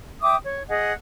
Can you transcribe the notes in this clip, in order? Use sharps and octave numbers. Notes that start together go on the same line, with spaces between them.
E5 G5 D6 D#6
C#5
G#4 D#5 F#5